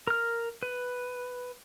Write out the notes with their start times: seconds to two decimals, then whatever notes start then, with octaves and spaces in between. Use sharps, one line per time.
0.07 A#4 F6
0.63 B4